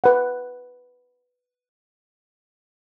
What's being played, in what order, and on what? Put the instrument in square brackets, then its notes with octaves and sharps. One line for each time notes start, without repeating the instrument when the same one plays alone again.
[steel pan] B4 F#5